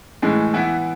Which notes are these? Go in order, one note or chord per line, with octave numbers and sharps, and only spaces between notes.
A2 E3 G#3
E3 B3 E4